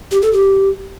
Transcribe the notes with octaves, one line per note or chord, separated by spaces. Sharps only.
G4
A4
G4